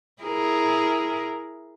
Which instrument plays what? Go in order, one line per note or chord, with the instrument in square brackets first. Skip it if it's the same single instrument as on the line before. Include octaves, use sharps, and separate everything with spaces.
[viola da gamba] E4 G#4 A#4